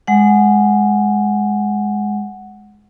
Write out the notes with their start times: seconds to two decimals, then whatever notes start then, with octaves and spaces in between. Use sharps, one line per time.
0.07 G#3 F#5